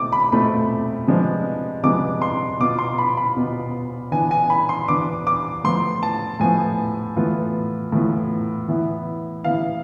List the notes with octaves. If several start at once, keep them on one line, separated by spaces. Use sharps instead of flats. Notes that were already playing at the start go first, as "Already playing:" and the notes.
Already playing: B2 A3 C4 D6
B5
B2 A3 C4 F4 B5
C3 F3 G#3 B3 D4
C3 F3 G#3 B3 D4 D6
C6
B2 B3 F4 D6
C6
B5
B5
B2 B3 F4
E3 B3 D4 G#5
G#5
B5
C6
E3 B3 D4 D6
D6
A2 F3 B3 C6
A5
A2 F3 B3 G#5
A2 E3 B3 F4
A2 E3 B3 F4
E3 B3 E4
E3 B3 E4 F5